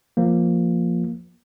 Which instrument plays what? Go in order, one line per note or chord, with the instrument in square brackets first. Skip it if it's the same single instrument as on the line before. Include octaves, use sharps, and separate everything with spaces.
[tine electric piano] F3 A#3